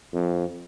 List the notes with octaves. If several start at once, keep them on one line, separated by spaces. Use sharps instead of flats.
F2